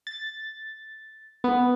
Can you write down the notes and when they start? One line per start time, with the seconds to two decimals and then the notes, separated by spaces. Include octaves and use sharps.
0.07 A6
1.44 B3